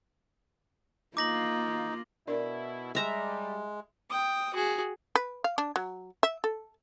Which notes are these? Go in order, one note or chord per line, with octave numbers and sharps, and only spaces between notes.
A#3 D#4 F4 D6 A#6 F#7
B2 D4 E4 A#4 D5
G3 G#3 E5 A#5
G5 D#6
F#4 G#4
B4
F5
D4
F#3
E5
A4